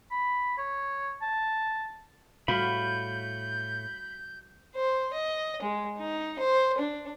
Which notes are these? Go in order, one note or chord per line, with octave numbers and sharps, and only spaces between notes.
B5
C#5
A5
A2 G3 F#4 F5 B5 G6
C5
D#5
G#3
D#4
C5
D4